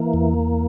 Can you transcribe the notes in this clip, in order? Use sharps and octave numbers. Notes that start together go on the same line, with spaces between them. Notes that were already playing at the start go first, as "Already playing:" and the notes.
Already playing: E3 A#3
E2